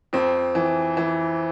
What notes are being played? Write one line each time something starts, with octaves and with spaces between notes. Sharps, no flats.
F2 C4
E3
E3